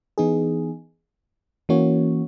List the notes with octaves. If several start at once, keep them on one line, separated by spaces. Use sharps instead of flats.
E3 B3 D#4 G#4
E3 A#3 C#4 F#4 C#5